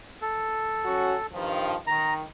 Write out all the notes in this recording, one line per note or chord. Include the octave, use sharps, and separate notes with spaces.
A4
F#3 C#4 F#4
G2 D#3 F3
D#3 A#5